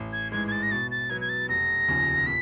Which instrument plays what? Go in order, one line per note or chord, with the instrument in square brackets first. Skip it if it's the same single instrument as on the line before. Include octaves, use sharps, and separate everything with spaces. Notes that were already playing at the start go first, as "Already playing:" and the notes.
Already playing: [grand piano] A1
[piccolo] G#6
[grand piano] G#2 E3 G#3 [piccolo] G#6
[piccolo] G#6
A6
A#6
[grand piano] B2 [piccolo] A6
[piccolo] A6
[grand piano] F#3 B3 [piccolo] G#6
[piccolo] G#6
A6
[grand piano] F1 [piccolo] A#6
[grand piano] D#2 C#3 F3
[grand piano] A#2 [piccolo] B6